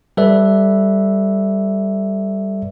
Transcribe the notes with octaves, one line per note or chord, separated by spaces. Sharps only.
G3 A4 B4 D5 E5